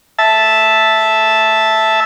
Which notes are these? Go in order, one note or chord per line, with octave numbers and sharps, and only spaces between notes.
E5 A5